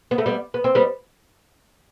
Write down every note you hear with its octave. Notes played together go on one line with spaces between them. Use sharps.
B3
A3
G3 B3
B3
C4
G3 B3